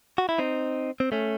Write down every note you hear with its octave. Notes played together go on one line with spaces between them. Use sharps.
F#4
E4
C4 D#4
C4
A3 C#4